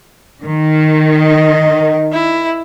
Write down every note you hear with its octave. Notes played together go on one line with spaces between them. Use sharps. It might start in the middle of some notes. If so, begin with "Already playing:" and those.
D#3
D#5
E4